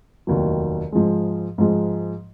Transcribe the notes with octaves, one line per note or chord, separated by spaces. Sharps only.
F1 D#2 D#3 F#3
G#2 F3 G#3
G#2 F3 G#3